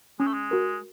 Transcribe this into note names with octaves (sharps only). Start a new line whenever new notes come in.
G#3 C#4
A3
G#3
F#4 A#4